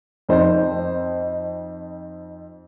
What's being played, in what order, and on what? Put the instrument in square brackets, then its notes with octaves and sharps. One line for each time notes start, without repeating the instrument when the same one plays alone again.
[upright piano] F2 D#4 C5